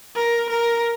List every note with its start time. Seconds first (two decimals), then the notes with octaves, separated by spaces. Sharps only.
0.16 A#4
0.50 A#4